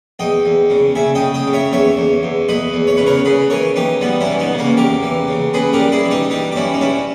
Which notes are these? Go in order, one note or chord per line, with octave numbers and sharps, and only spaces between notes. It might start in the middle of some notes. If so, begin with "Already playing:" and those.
E2 D#5 G5
E2
C#3
C#3 E5 G#5
D#5 G5
C#3
D#5 G5
C#3
C#5 E5
E2 C#5 E5
E2
E2
E2 B4 D#5
E2
C#5
C#3 B4
A#4 C#5
C#3 G#4 B4
E3 A#4 C#5
E3 D#4 G4
G3 B3 D#4
C#4 E4
E3
B3 D#4
C#3
A#3 C#4
E2 G4 A#4
E3
C#3
C#3 G#4 B4
G4 A#4
G3
E4 G#4
E3
D#4 G4
G2 D#4 G4
G4
G3 C#4 E4
D#4
G2 C#4 E4